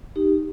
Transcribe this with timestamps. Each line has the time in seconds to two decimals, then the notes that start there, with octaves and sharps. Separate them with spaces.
0.16 D#4 G4